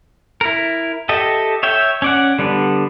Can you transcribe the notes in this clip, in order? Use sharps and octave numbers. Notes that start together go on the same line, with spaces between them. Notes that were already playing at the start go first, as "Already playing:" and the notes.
E4 A#4
G4 A4 D#5 E5
C#5 E5 G5
C#4 D5 F#5
D3 G3 B3 D4